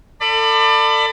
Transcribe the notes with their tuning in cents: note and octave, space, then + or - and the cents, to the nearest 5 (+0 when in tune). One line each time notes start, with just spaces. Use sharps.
A4 +30 D5 +30 B5 +20